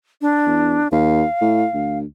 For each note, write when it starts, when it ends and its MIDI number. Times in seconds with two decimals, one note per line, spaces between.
0.22 0.88 62
0.46 0.78 40
0.92 1.24 39
0.92 1.98 77
1.41 1.65 45
1.74 2.05 38